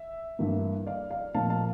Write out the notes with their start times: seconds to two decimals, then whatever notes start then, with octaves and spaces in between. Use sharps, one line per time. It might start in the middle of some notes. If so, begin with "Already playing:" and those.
Already playing: E5
0.39 G2 E3 A#3
0.87 D5 F5
1.11 D5 F5
1.34 A#2 F3 A#3 F5 A5
1.50 F5 A5